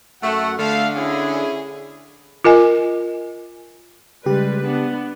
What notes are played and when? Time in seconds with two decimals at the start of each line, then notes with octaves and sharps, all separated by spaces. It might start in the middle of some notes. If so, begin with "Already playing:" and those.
0.23 F#2 A3 F#4 F#5
0.58 D3 A3 F5
0.96 C#4 E4 G#4
2.44 F4 A#4 D#5 G#5
4.26 C#3 G3 G#3 G4 B4
4.64 B3 D4